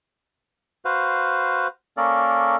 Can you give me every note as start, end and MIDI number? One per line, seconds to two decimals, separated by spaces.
0.85 1.67 66
0.85 1.67 71
0.85 1.67 72
0.85 1.67 77
1.97 2.56 58
1.97 2.56 61
1.97 2.56 69
1.97 2.56 70
1.97 2.56 74